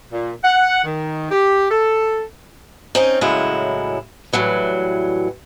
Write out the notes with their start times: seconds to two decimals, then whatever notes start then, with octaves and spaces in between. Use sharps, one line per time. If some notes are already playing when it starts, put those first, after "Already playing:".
0.11 A#2
0.43 F#5
0.84 D#3
1.31 G4
1.70 A4
2.95 C4 C#4 D#4
3.21 A2 C#3 F#3 G#3 E4
4.33 A2 E3 F#3 G3